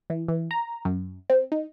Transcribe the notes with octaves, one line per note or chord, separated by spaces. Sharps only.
E3
E3
A#5
F#2
C4
D#4